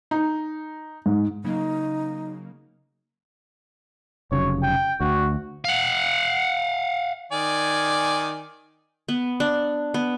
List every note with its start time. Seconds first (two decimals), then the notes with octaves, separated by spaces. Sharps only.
0.11 D#4
1.06 G#2
1.44 C#3 F#3 A#3 D#4
4.32 F1 C#3 F#3 C#5
4.63 G5
5.00 D2 F#4
5.65 F5 F#5
7.32 D#3 D5 G#5
9.09 B3
9.40 D4
9.94 B3